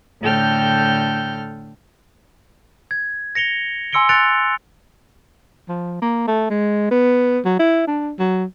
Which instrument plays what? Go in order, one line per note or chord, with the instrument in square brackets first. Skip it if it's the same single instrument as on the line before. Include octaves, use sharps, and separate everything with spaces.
[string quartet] A2 D3 A4 G5 F6 G6
[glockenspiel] G#6
A#6 C#7 F7 G7
G#5 C6 E6 C#7 D7 G7
F#6 A6 C#7 D7 F7
[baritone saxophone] F3
A#3
A3
G#3
B3
F#3
E4
D4
F#3